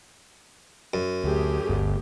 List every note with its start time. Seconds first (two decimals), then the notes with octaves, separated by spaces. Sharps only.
0.94 F#2
1.24 D2 A3 G4 G#4
1.69 G1 D2